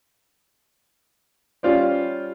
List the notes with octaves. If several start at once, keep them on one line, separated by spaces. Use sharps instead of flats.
G3 C#4 F4 C5 D5